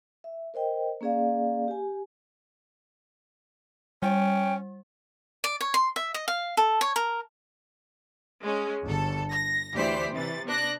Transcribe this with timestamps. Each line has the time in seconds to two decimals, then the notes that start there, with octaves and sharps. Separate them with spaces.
0.24 E5
0.54 A#4 C5 D#5 G5
1.01 A#3 C#4 G#4 D5 F5
1.68 G4 G#5
4.02 G3 C#4 G5
5.44 D5
5.61 C#5
5.74 C6
5.96 E5
6.14 D#5
6.28 F5
6.57 A4
6.81 C#5
6.96 A#4
8.43 G#3 C#4
8.84 G1 A4
9.32 A#6
9.75 D2 E3 G4 C5 D5 B6
10.12 C3 E3 A6
10.47 B3 D4 F#6 A#6